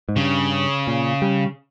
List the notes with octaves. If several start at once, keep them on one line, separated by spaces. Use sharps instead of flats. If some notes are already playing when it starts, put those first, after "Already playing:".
G#2
G2 C#3
A#2
G3